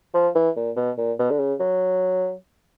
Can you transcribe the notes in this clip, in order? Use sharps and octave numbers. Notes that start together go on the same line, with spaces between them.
F3
E3
A#2
B2
A#2
B2
D3
C#3
F#3